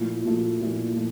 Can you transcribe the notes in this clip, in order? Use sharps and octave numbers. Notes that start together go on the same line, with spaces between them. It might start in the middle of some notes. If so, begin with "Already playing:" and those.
Already playing: A#2 F3 A3 E4
A#2 F3 A3 E4
A#2 F3 A3 E4
A#2 F3 A3